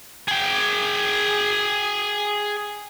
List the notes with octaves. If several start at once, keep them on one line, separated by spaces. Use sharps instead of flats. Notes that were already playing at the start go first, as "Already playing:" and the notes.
G#4 G5